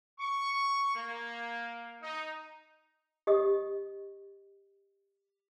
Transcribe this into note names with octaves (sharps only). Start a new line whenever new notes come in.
C#6
A#3
D#4
G4 D#5 D#6